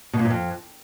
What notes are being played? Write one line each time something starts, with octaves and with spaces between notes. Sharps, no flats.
B2
A#2
G#2
F2